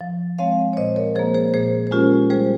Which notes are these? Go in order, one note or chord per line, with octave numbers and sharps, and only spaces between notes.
F3
G#3 C4 C#5 F5
C#5
A#2 C5 D#5
A#4 C#5
F3 A#3 G#4 C5
G#4 C5
A#2 G#4 C5
C5
G#3 C#4 F4 G4 A#4
G3 G#4 C5